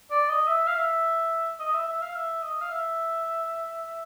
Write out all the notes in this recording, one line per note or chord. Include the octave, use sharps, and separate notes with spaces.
D5
D#5
E5
F5
E5
D#5
E5
E5
F5
E5
D#5
F5
E5